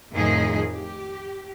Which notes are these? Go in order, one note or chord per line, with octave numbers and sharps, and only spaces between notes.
F2 A2 D#3 F3 G#4 D#5
G4